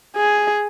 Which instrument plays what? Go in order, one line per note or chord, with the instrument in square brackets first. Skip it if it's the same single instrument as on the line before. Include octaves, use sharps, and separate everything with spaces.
[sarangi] G#4